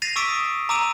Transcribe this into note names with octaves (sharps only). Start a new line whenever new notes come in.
A6 A#6 C7 D#7 F7
C#6 D6 E6 B6 D7 E7
D#6 D#7
A#5 D6 E6 D7 D#7 F7